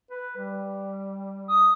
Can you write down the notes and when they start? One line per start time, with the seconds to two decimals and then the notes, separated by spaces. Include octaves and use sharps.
0.11 B4
0.37 G3
1.48 D#6